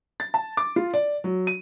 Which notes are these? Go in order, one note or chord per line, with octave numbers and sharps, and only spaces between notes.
A6
A5
D6
F4
D5
F#3
D#7